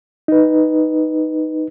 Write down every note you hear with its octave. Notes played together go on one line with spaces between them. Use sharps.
D#4 B4